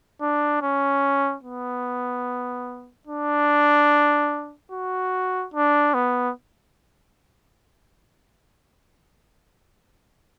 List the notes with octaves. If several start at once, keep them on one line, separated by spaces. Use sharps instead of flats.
D4
C#4
B3
D4
F#4
D4
B3